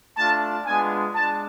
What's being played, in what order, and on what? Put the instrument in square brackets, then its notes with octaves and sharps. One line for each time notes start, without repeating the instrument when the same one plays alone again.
[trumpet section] A3 D4 F4 A5
G#3 B3 D4 F4 G#5
G#3 D4 A5